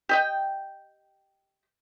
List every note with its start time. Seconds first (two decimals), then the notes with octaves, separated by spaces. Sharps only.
0.09 G4 D#5 G5